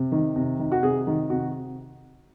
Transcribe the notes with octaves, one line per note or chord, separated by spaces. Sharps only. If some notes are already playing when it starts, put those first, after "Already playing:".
Already playing: C3
D#3
C3
D#3
F#4
C3 G#4
D#3
C3 F#4